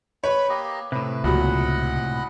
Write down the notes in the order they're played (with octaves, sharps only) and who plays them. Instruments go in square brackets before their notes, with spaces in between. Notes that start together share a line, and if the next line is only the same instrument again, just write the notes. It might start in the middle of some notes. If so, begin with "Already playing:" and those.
[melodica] B4 B5 [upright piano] C#5
[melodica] A#3 G4 D#5
[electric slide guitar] A2 C3 [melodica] B4
[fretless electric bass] C#2 [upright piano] A#2 F#3 [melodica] D#5 F#5 B5